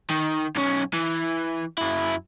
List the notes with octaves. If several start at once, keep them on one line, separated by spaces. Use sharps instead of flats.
D#3
B1 C#4
E3
F#2 E4